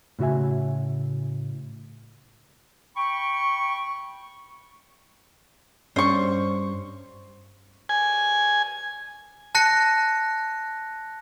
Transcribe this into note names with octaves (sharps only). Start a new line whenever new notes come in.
A2 C#3 F#4 E5 G#5
G5 B5 C#6
G2 C#4 D4 C5 C#6
G#5
A5 F#6 A#6 C#7